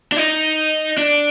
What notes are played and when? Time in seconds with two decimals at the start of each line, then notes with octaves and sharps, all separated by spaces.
0.12 D4
0.17 D#4
0.98 D4